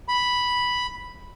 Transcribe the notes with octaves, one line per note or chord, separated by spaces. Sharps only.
B5